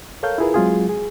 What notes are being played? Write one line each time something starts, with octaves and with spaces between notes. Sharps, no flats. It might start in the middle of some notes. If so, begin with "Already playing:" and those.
A4 A#4 C#5 F5 G6
E4 F4 G#4 A#4 B4
F#3 G#3 C4 F4 F#4 G#4
G#4